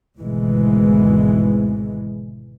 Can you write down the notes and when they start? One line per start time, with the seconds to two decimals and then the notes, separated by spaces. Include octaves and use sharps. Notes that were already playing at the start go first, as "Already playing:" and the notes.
0.18 G#1 D2 B2 E3 G#3